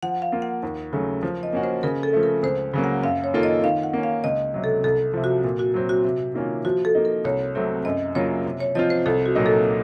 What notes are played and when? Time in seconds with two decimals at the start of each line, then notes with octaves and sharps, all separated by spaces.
0.03 F3 F#5
0.22 F5
0.32 A#3 F4
0.42 F#5
0.63 D#2
0.93 C#3 F#3 A3
1.23 F3
1.43 D#5
1.53 A#3 C#4 F#4
1.64 C5
1.83 C#3 A#4
2.03 A4
2.13 F3 A3
2.23 A#4
2.43 C#2 C5
2.74 C#3 F#3 A#3
2.84 F#5
3.03 F#2 F5
3.24 C#5
3.34 D#3 A#3 F4 A4
3.43 D#5
3.64 D#3 F5
3.83 F#5
3.93 A#3 C#4
4.03 F5
4.24 C#2 D#5
4.54 C3 F#3
4.64 A4
4.84 C2 A4
5.14 C3 F3
5.24 F#4
5.44 A#2
5.59 F#4
5.74 F#3 C4
5.89 F#4
6.04 C3
6.34 D#3 A#3 C#4 F4
6.65 F3 F#4
6.85 A4
6.95 A#3 D#4
7.05 A#4
7.25 C2 C#5
7.55 C3 F#3 A3 C4
7.85 F#2 D#5
8.15 C#3 F#3 A#3 F4 C#5
8.45 C3
8.60 C#5
8.75 F3 C4 F4 D#5
8.90 C5
9.06 C2 A4
9.26 F#4
9.35 A#2 F#3 A#3 D#4
9.46 A4